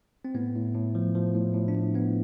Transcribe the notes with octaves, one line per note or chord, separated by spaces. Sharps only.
C4
A2 B3
A2
A2
F3
F3
A2
A2
D4
A2
A2 B3